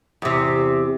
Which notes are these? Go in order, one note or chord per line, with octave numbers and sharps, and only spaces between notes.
E2 C3